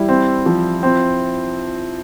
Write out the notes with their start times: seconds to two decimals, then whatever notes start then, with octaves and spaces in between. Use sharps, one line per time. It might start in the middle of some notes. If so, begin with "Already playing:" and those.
Already playing: G3 E4
0.09 C4
0.46 F3
0.83 C4